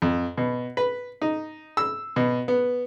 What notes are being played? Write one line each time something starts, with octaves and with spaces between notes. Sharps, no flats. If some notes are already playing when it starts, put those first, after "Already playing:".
F2
B2
B4
D#4
E6
B2
B3